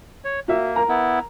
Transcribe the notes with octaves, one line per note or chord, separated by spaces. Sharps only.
C#5
A#3 F#4 E5
A#4 A#5
B3 E4